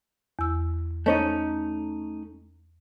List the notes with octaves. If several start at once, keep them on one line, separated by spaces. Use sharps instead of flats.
E2 E6
A3 C#4 D#4 C5 C#5 D#5